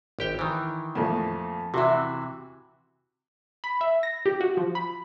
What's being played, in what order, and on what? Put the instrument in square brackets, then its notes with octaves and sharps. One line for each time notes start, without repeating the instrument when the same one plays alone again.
[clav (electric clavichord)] G#1 G4 G5
D#3 E3
[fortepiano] F2 A#2 A3
[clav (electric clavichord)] C3 E3 [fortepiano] F#4 E5
[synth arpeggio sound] B5
E5
A#6
G4
F#4
F3
B5